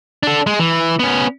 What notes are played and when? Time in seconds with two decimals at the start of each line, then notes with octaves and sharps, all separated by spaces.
0.23 D4 A4
0.47 G#3
0.60 E3
0.99 B3 C#4